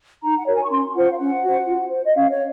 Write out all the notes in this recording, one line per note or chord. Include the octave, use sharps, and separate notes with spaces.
D#4 A#5
F#5
F#4 A#4 C#5
G#5
C#6
C#4 C6
F4 C5 F#5
F5
C#4 F#5
F#4 C5
F4
C5
D#5
C#4 F5
C#5